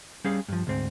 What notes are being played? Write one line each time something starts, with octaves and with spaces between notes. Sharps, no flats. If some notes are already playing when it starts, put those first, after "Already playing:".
G3 C#4 G#4 F5
G2 F3
D2 G#2 C4